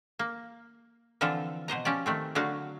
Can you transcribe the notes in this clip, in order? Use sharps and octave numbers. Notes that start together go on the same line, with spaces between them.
A#3
D3 E3 F3 C4 F4 A4
B2 C5 D#5 A#5
F3 C#4 G4 D5
D#3 A3 C4
D3 F#3 A3 F#4 F5 F#5